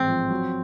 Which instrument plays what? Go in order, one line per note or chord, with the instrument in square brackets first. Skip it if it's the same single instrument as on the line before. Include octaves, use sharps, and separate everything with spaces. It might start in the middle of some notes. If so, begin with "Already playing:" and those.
Already playing: [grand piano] A1 G#2 G#3 [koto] C4
[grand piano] F3
F#3